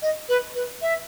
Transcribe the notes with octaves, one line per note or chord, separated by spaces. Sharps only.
D#5
B4
B4
E5